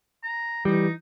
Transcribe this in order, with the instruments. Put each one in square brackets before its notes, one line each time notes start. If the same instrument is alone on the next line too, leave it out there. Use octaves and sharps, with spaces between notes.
[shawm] A#5
[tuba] E3 [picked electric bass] G3 [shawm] D#4